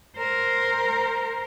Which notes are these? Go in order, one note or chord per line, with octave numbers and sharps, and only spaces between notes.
A#4 C5